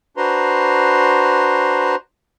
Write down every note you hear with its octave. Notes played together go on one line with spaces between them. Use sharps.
D4 F#4 B4 C5 A#5 C6